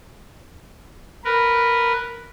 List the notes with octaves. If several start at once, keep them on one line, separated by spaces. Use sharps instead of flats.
A#4 B4